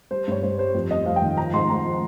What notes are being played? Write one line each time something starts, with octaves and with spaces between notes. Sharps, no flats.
G3 C5
G2 C#5
G2 C5
G3 C5
F2
G3 D#5
F2 F5
G5
D#3
F3 A#5
G#2 C6
G#2 A#5
F3